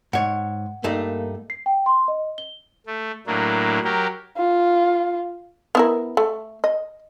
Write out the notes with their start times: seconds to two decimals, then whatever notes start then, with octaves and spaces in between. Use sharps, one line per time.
0.13 G#2 C#5 F#5
0.84 G2 A3 A#3 D#4
1.50 C7
1.66 G5
1.86 C6
2.08 D#5
2.38 G7
2.87 A3
3.27 A2 F#3 A#3 D4
3.84 F#3 G4 A#4
4.38 F4
5.75 B3 E4 A#4
6.17 A3
6.64 D#5